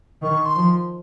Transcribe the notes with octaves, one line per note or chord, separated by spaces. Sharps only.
D#3 C#6
C6
F3